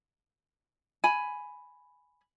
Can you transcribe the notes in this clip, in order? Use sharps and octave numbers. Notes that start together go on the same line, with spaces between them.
G#5 B5